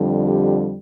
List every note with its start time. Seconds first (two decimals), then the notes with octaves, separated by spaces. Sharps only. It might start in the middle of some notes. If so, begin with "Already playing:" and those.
Already playing: F2 D3 G3
0.28 G4